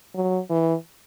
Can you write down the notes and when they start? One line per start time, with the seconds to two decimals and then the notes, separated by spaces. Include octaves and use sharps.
0.15 F#3
0.50 E3